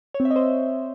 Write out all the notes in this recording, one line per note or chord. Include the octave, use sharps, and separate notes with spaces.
C#5
C4
E5
D#5
C5